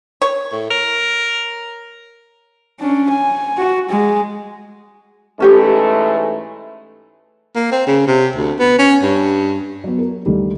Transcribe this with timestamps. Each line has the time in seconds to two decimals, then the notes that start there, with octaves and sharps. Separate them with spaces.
0.22 C#5
0.52 A2
0.70 A#4
2.80 C#4 D4
3.09 G#5
3.58 F#4
3.90 G#3
5.40 G#2 E3 A3 C#4 G4 C#5
7.55 A#3
7.72 C4
7.87 C#3
8.07 C3
8.36 D2
8.59 B3
8.78 C#4
9.02 G2
9.84 F#3 B3
9.99 A#4
10.26 D2 D#3 G3